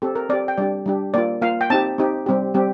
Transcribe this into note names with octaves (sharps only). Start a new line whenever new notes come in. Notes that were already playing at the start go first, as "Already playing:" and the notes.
C4 G4 A4
A#4
C4 G4 D5
G5
G3 D4 G4 D5
G3 D4 G4
A#3 F4 D5
A#3 F4 F5
G5
C4 D#4 G4 A5
C4 D#4 G4
G3 C4 G4
G3 C4 G4